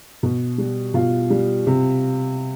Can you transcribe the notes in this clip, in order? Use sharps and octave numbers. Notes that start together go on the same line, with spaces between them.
B2
G3
B2 F4
G3
C3